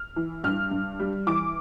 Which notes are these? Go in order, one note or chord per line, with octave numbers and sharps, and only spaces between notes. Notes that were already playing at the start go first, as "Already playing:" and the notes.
Already playing: F6
E3
G2 F6
G2
G3
E3 D6